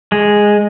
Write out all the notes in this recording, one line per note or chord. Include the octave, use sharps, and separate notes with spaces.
G#3